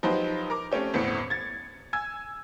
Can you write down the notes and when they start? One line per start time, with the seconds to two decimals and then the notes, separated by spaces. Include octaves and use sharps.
0.03 F3 F#3 D#4 G4 B4 C5
0.50 A#4 A#5 D6
0.71 A3 C4 C#4 G4
0.94 G1 E2 A2 B3 C4 C#7
1.30 G#6 A6
1.93 G#5 E6 G#6